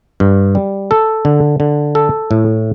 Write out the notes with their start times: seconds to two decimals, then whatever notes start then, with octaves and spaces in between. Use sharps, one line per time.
0.20 G2
0.55 G3
0.91 A4
1.25 D3
1.60 D3
1.95 A4
2.31 A2